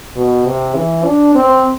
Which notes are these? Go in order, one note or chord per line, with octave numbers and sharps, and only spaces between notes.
B2
C3
E3
D4
C4